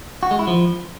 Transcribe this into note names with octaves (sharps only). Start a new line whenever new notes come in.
F#4
G#3
E4
F3